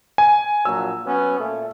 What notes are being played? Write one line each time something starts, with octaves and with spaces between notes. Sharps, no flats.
G#5
A#1 A#2 F#3 E6
F#3 B3 C#4
A#2 A3